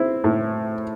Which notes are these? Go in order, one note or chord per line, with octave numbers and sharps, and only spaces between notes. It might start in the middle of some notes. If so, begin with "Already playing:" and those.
Already playing: C4 E4
A2